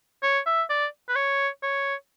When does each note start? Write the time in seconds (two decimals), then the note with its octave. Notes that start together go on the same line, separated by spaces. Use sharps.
0.23 C#5
0.46 E5
0.70 D5
1.09 B4
1.16 C#5
1.62 C#5